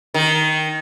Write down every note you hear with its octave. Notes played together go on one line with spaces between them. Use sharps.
D#3